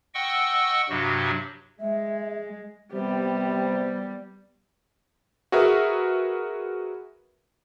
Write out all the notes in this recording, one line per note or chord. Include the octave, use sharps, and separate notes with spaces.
D#5 F#5 G5 C#6 E6
G2 C3 F#3 F#4
G#3 E5
C3 G3 B3 G4
F#4 G#4 A#4 B4 E5